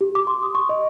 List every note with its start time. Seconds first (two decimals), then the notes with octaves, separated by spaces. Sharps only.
0.01 G4
0.15 D6
0.27 C6
0.43 D#6
0.55 C#6
0.69 D#5